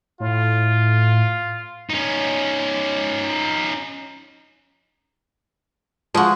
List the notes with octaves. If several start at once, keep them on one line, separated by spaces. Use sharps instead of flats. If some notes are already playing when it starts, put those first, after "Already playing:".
A2 F4
C#4 D#4
F3 G#3 F#4